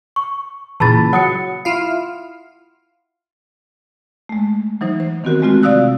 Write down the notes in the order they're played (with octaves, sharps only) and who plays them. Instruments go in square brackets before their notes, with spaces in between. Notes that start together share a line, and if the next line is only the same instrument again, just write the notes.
[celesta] C#6
[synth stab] A#2 C#3 E3 [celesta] A5 B5 A6
[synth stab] F#3 [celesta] F#5 D#6 C#7
[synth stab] E4 F4 F5
[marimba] G#3 A3
E3 F#3 D#4 C5
C5
D#3 B3 C4 F#4 G4 A#4
G#3 A3 C4 F4 F#4
C3 D5 F5 D#6 E6 F#6